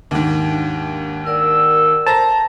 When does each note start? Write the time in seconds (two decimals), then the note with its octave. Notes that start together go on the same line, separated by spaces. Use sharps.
0.11 D#2 G#2 D4 F#5
1.26 A#4 D5 F#5 E6
2.07 C5 A5 A#5 A#6